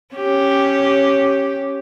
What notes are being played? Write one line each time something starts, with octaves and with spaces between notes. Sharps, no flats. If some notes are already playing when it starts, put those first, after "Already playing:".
C#4 G4